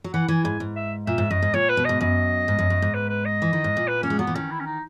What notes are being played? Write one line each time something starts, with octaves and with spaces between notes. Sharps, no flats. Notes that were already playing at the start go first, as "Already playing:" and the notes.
F#3
E3 F#5
E3 G#5
G#2 G#5
G#2
E5
A#2 E5
G#2
F#2 D#5
G#2
A#2 C#5
B4
B2
G#2 D#5
F#2 D#5
G#2
F#2
F#2
G#2
B4
B4
D#5
E3
D#3
G#2
A#2
B4
A#3 C#4
G#3
F#3 B3
E3
D#3 C#4
E4
C#4
D#4